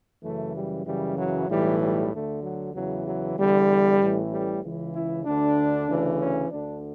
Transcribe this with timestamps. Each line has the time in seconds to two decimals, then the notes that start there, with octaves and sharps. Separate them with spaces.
0.23 F#2 C#3 E3 A3
0.54 G3
0.85 F#2 C#3 E3 G3
1.17 F#3
1.49 B1 A2 E3 G3
1.79 G3
2.11 D2 D3 A3
2.42 F#3
2.73 E2 C#3 E3 F#3
3.05 F#3
3.37 E2 D3 G3
3.99 A1 A2 E3
4.30 G3
4.62 C#2 C#3 E3
4.93 E4
5.25 D2 D3 D4
5.87 D2 C#3 E3
6.18 C#4
6.49 D2 D3 D4